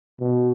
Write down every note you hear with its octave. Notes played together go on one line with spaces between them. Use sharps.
B2